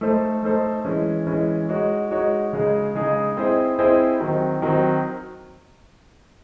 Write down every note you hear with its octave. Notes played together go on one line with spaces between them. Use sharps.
A3 D#4 A4 C5
A3 D#4 A4 C5
E3 G#3 C#4
E3 G#3 C#4
G#3 D#4 F#4 C#5
G#3 D#4 F#4 C#5
C#3 G#3 D#4 G#4
C#3 G#3 D#4 G#4
C4 E4 G#4 C5 D#5
C4 E4 G#4 C5 D#5
D#3 F#3 C4
D#3 F#3 C4